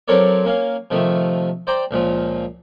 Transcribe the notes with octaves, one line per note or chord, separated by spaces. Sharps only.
F#3 C4 A4 A#4 C#5 D5
A#3 C#4 F5
C3 D#3 F3 A3
C5 D5 G5 A#5
C#2 A#2 F3